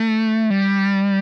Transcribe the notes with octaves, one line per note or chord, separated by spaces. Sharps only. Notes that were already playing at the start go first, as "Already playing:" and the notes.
Already playing: A3
G3